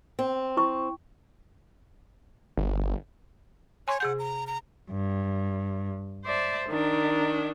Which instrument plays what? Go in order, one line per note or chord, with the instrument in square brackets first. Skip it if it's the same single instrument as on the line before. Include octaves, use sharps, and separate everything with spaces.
[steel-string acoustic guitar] C4
[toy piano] E4 C#6
[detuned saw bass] G1
[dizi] C#5 [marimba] G#5 C6 C#6
[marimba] C3 G#4 G6 [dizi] F#5
[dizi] A#5
A#5
[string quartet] G2
C5 D5 E5 A5
D#3 D4